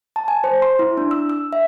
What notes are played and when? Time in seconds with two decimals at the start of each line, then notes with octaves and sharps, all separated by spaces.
0.16 A5
0.28 G#5
0.44 C5
0.62 C6
0.79 E4
0.97 D4
1.11 E6
1.30 E6
1.53 E5